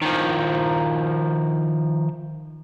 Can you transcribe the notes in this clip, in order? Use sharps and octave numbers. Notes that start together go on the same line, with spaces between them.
D#3 F3